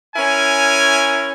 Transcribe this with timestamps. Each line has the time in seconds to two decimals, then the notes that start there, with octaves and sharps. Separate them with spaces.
0.16 C#4 E4 A#4 G#5